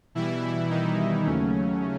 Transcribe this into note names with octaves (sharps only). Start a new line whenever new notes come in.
B2 E3 G3 E4
D#3 D#4
D#2 C#3 F#3 A3 C#4